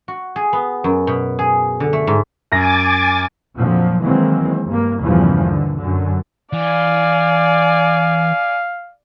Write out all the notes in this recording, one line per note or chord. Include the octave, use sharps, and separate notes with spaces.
F#4
G#4
B3
F#2
B2
G#4
D3
A3
G#2
F#2 G#5 D6 A6 A#6
F2 A#2 D3 F3 F#3
D#3 E3 F#3 G#3 A#3 C4
G2 A#3
E2 G2 A#2 C#3 E3 F3
D#2 D3
F#2 D3
E3 D5 F5 G#5